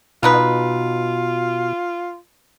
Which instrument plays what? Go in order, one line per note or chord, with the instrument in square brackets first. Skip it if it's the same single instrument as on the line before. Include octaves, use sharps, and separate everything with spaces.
[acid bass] B2 [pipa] B3 D#4 B4 [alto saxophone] F4